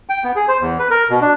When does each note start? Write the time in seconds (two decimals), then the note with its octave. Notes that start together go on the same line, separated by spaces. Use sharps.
0.09 G5
0.24 B3
0.36 G#4
0.48 C5
0.61 E2
0.79 B4
0.91 A#4
1.10 B2
1.21 D4